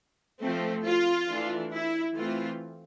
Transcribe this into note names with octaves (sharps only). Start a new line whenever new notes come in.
F3 A3 C4
F4
E3 A3 D4
E4
E3 A3 C4 F4